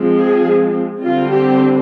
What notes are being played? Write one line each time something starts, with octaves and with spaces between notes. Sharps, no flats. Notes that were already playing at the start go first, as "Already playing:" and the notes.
Already playing: F3 G#3 C4
G#4
D3 G3 C4 F4
G4